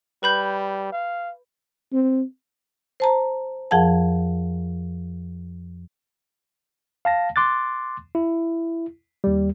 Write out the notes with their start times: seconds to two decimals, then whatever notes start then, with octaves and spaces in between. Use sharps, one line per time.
0.23 G3 B4 B5 G6
0.92 F5
1.92 C4
3.00 C5 A5 A#5
3.71 F2 F3 G#4 A#4 F#5 A5
7.05 F5 A5 A#6
7.36 C6 D6 F#6 A6
8.15 E4
9.24 D#2 G3